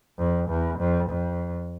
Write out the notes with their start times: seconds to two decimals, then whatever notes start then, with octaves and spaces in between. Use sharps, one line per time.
0.18 F2
0.49 E2
0.79 F2
1.10 F2